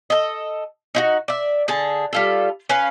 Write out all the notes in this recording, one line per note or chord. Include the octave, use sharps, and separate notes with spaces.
A4 D#5
D#4 E4 F#4
D5 E5
D3 G#4 A5
G3 F4 A4
C#4 B4 F5